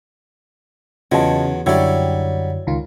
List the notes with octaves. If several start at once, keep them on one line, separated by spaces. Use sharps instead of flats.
E2 C#3 F#3 F4 D#5 A5
F#2 D3 F#3 G3 E4 C#5 G5
C#2 D#3 F4